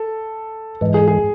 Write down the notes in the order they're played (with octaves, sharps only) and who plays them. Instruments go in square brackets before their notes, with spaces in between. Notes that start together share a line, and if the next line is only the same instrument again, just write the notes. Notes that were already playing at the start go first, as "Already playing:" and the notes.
Already playing: [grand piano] A4
[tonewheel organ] G#2 E3 G#3
[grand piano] G#4
G#4